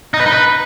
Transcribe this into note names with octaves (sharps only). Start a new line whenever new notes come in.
D#4
B4
D#4
B4